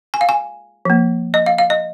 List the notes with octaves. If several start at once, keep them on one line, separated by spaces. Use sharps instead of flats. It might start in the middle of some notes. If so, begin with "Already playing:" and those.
G#5
F5
G#5
F3 A#3
D#5
F5
F5
D#5